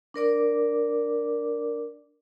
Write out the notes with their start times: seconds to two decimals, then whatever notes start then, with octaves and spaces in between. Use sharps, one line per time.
0.14 D4 A#4 D5 D6